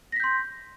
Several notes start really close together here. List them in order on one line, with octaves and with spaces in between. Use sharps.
A#6 B6 G6 C6